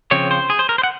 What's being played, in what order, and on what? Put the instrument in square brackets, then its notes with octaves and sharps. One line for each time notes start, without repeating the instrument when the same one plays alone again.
[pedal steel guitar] C#3 F3 C4 C#5
C5
G#4
C5
A#4
C5
F#5